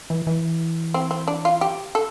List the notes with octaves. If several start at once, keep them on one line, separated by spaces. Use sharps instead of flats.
E3
E3
C4
C4
D4
F4
G4
A4